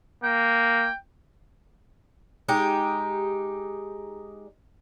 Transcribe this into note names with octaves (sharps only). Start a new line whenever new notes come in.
A#3 G5
G#3 D#4 G4